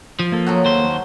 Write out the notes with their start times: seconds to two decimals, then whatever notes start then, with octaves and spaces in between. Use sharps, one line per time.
0.19 F3
0.32 A#3 A4
0.46 F#3 A3 F#4
0.65 D#2 C5